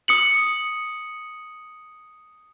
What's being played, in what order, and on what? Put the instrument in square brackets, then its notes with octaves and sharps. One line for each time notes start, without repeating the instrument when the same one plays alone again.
[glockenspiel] D#6 C#7 F#7